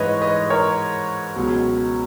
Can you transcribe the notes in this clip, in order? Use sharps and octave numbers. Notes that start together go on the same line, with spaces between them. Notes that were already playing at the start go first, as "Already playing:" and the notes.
Already playing: G#2 E3 B4 C#5 D#5
B4 D#5
A#4 C#5
C#2 B2 F#3